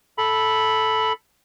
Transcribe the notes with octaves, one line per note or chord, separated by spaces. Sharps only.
A4 B5